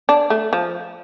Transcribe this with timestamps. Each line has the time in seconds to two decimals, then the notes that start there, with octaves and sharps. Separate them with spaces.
0.09 D4
0.30 A3
0.53 F3